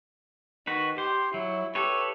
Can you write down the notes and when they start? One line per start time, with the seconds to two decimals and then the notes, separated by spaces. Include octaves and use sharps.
0.67 D#3 F#4 B4
0.98 G4 C5
1.34 F#3 E4
1.75 G4 A4 B4 C#5